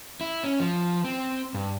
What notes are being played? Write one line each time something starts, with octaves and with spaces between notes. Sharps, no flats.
E4
C#4
F3
C4
G2